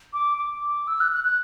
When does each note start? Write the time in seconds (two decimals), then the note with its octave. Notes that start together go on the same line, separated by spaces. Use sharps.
0.13 D6
0.38 D6
0.87 E6
1.00 F#6
1.13 F#6
1.25 F#6